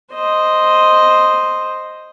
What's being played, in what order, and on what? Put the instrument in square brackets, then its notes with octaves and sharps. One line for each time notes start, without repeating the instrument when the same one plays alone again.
[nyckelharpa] C5 D#5